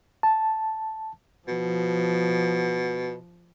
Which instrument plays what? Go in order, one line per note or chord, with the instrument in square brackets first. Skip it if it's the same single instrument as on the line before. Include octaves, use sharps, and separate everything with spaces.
[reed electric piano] A5
[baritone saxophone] B2 [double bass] F3